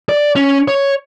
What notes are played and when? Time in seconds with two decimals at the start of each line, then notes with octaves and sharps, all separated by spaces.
0.09 D5
0.36 C#4
0.68 C#5